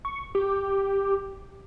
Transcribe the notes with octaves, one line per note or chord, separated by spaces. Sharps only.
C#6
G4